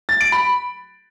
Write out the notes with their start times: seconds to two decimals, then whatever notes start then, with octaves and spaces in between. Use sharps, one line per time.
0.09 A6
0.21 D7
0.32 B5